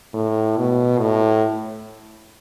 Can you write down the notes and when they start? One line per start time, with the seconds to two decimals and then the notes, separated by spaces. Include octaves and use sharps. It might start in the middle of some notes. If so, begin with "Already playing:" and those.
0.14 A2
0.57 B2
0.99 A2